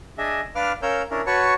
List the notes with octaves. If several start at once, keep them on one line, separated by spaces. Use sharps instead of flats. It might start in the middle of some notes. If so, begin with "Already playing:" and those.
D4 G#4 D#5 E5
D4 B4 F5 D6 F6
C#4 A#4 C#5 F5 E6 G6
C#4 D4 E4 A#4
F#4 B4 C#5 A5 C#6